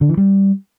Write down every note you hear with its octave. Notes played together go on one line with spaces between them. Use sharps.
D3
E3
G3